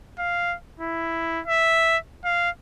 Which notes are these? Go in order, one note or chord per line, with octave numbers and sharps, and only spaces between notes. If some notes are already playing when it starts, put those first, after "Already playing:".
F5
E4
E5
F5